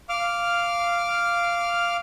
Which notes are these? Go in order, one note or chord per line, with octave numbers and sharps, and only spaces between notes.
F5 D6 F6